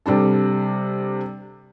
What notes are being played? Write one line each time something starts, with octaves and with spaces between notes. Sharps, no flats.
C3 G3 D4 A4